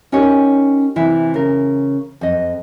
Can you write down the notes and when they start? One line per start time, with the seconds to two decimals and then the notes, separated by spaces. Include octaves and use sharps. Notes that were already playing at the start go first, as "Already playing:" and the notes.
0.12 C#4 D#4 G4 A#4 C#5
0.96 C3 E3 E4
1.34 C#3 A#4
2.21 F2 D#5